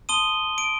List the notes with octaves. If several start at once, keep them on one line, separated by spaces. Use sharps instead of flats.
A5 C6 D#6 D#7 G7
D7